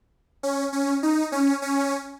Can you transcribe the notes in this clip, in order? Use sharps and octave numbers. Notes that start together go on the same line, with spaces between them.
C#4
C#4
D#4
C#4
C#4